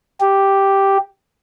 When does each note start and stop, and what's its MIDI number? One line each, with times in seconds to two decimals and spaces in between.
0.20 0.98 67